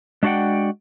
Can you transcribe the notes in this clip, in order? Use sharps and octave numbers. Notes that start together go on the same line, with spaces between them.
G#3 D4 F#4 D5 F#5 G5